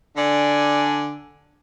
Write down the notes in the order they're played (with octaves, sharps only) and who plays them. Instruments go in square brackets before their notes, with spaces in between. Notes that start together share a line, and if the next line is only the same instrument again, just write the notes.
[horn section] D3 D4 D5 G#5